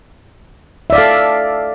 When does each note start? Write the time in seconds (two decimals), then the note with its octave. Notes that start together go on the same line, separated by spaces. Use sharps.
0.90 E5
0.92 D5
0.95 F5
0.98 A4